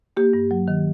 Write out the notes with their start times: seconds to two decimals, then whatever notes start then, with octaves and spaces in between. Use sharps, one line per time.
0.17 A#3 G4
0.33 G2
0.51 F#3
0.68 D#3